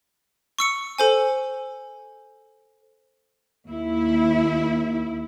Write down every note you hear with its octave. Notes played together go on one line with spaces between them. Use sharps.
C#6 E6 C#7
A4 C5 G#5
D#2 E4